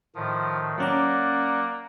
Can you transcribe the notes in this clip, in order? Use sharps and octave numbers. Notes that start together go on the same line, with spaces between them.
A2 D#3 F3
F#3 A#3 C#4 D5 F#5 A#5